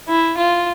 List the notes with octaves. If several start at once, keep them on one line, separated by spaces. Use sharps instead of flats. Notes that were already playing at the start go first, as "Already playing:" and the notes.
E4
F4